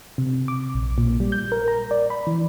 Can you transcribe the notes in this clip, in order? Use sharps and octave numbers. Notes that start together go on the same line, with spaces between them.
C3
D6
A#1
A#2
G3
G6
A#4
A#5
D5
B5
E3